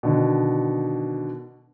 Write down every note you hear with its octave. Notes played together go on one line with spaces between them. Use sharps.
B2 D3 D#3